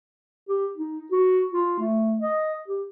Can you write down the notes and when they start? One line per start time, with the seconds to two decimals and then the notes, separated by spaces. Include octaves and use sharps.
0.49 G4
0.77 D#4
1.12 F#4
1.52 F4
1.79 A3
2.21 D#5
2.68 G4